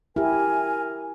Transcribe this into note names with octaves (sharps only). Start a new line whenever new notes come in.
E4 G4 A#4 G#5